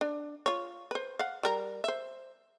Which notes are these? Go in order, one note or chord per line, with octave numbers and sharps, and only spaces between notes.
D4
F4 C#5
B4 C5
F5 F#5
G3 A#4 A#5
C5 E5